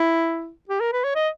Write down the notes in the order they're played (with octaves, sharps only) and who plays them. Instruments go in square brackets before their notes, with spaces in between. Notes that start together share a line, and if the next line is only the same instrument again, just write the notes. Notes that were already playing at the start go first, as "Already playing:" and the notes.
Already playing: [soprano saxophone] E4
G4
A#4
B4
C#5
D#5